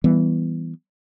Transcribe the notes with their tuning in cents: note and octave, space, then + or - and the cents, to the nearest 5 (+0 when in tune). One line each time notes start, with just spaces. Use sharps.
E3 +0 G3 +0 B3 +0